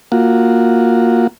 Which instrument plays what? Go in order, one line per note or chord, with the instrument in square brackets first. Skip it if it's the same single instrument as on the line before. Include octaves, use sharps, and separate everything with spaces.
[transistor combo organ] A#3 F4 F#4